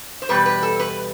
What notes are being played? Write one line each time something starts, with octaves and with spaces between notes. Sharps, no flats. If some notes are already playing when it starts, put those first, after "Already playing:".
C5
E2 B2 G3 B4
B4
A4
B4